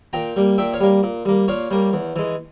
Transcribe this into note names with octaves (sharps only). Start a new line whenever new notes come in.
A#2 G5 A#5
G3 A#3
A#2 E5 G5
C#5 F5
G3 A#3
A#2
G3 A#3
A#2 C#5 F5
G3 A#3
E2
E3 G#3